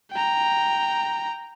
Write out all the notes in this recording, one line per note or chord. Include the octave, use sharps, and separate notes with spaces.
G5 A#5